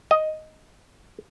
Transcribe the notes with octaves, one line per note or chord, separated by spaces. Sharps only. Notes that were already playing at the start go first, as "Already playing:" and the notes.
D#5